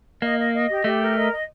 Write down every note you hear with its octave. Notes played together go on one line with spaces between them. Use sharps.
A#3 D#5
D#5
D#5
G4
A3 G4
A#4
D#5
D#5